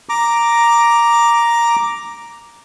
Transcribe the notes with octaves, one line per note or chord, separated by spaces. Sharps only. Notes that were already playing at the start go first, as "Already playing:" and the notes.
A#5 D6